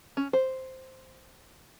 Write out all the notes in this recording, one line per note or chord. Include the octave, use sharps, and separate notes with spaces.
C#4
C5